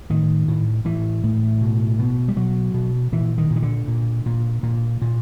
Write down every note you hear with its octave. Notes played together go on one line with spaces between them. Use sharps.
A2 D#3
A2
A2 E3
A2
B2
B2
G3
B2 F#3
B2
A#2 E3
D#3
A#2
D#3
D3
A#2
A#2
A#2
A#2